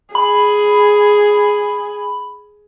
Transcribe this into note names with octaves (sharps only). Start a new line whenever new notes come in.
G#4 B5